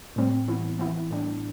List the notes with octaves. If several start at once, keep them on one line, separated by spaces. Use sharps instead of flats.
A2 G3 C4
E3 B3 E4
E3 B3 E4
A2 G3 D4